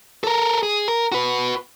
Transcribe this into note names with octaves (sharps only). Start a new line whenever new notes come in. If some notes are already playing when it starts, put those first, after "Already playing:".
A4 A#4
G#4
A#4
F#4 B4